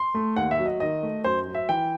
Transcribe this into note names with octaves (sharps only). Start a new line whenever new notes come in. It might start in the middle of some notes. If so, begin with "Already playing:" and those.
Already playing: C6
A3
D#2 F#5
E5
F#3
D#5
D#3 D#5
A3
F#2 C5
F#3
E5
E3 G5